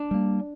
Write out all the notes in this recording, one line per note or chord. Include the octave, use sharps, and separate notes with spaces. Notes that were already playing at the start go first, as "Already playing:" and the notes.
Already playing: D4
G3 A#3